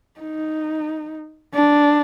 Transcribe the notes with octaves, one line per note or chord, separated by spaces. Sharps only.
D#4
D4